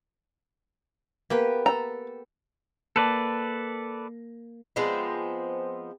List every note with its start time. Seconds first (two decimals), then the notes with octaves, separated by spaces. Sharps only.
1.30 A#3 B3 G4 B4
1.66 A4 A#5
2.96 A#3 A4 B4 D5 A5
4.76 F3 G#3 B3 C4